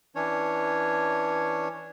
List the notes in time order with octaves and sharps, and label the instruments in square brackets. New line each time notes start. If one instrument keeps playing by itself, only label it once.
[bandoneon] E3 C#4 D4 C#5